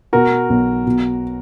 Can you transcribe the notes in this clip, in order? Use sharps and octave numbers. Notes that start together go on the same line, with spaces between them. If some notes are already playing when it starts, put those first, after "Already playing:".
B2 F#4 A#4
B1
B2